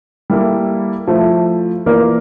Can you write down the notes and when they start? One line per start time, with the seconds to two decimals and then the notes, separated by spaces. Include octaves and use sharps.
0.30 G3 A#3 E4 A4
1.07 F3 A3 E4
1.86 E3 A#3 F4 A#4 D5